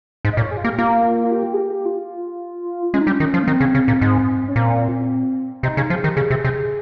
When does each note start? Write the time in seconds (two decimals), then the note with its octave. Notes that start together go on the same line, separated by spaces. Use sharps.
0.25 G#2
0.33 D#5
0.37 A#2 C#5
0.51 G#4
0.57 F4
0.64 A#3 G4
0.78 A#3 F4
1.24 F4
1.31 G4
1.53 G#4
1.58 G4
1.85 F4
2.93 G#3 C#4
3.01 D#4
3.07 G3 C#4
3.20 D#3
3.34 F3
3.43 A#3
3.47 D#3 C4
3.60 C#3
3.75 C#3
3.88 A#2
4.01 G#2
4.48 C#4
4.56 A#2 C4
5.63 C3 D#4
5.77 C#3
5.90 F3 G4
5.97 G#4
6.04 D#3 G4
6.17 C#3 G#4
6.30 C3
6.45 C3